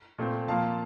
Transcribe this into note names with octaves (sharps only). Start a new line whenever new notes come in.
A#2 A3 C4
A#2 F3 A#3 F5 A5